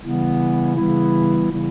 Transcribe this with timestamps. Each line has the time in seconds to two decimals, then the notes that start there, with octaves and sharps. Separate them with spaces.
0.02 C#3 E3 G3 B3 E4
0.76 C#3 E3 G3 B3 E4
1.50 C#3 E3 G3 B3 E4